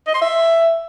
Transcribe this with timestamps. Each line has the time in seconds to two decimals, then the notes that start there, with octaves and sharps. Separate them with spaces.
0.07 D#5
0.14 C6
0.22 E5